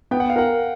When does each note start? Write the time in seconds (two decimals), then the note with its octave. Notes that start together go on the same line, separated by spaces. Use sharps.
0.11 B3 G5
0.20 F#5
0.30 F5
0.36 A#4 F#5